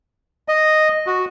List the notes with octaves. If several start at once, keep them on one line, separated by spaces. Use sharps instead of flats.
D#5
F#4